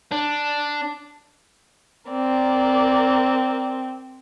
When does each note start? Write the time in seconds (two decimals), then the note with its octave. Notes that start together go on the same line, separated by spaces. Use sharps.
0.12 D4
2.11 C4 A#4 D5